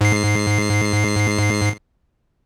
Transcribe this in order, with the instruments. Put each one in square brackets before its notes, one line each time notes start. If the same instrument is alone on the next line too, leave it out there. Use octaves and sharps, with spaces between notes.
[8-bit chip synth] G#2 C7